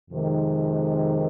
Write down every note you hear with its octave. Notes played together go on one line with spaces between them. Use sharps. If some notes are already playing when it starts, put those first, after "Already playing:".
F2 C3 D#3 G#3